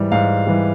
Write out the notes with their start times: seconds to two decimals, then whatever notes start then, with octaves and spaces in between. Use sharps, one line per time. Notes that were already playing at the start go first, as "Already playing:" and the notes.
Already playing: G#2 E3 G3
0.12 G#2 F5
0.47 E3 G3